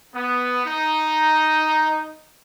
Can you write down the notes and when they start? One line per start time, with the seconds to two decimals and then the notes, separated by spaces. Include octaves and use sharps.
0.15 B3
0.66 D#4